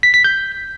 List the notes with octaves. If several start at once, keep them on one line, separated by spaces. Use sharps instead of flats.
B6
B6
G6